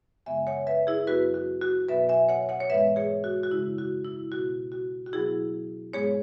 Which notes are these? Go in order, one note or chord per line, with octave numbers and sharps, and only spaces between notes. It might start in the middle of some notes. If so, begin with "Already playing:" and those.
F#2 C#3 E3 G#3 B3 E5 G#5
C#5 F#5
B4 E5
E4 G#4
F#2 F#3 B3 F#4 B4
F#4
F#4
B2 F#3 B3 B4 E5
E5 G#5
C#5 F#5
C#5 F#5
C#5
G#2 E3 G#3 B3 B4 E5
G#4 C#5
F#4
F#4
F#2 C#3 G#3 E4
F#4
E4
B2 B3 F#4
F#4
F#4
B2 F#3 B3 E4 G#4
G#2 G#3 B3 G#4 C#5